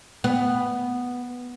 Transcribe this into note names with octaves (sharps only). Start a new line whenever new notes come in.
B3